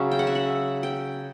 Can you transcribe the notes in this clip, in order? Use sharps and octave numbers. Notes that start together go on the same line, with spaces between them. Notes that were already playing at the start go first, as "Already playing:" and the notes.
Already playing: C#3 F#3 C#4 E5
G5
F#5
E5
F#5
G5